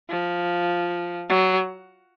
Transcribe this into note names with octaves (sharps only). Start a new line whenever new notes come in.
F3
F#3